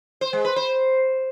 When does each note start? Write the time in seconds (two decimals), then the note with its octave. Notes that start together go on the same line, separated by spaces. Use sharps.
0.21 C5
0.33 G#3
0.45 B4
0.56 C5